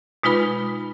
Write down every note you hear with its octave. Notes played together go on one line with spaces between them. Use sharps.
B2 G#3 D#4 F4 B4 B5